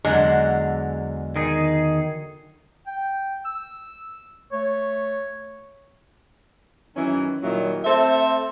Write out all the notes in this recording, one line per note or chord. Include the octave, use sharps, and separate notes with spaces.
E2 D3 F#3 G#3 F#5
D#3 D#4 G#4
G5
E6
A3 C#5
F#2 D#3 E3 C#4
A#2 D#3 F#3 G3 E4
A3 C4 A4 C5 E5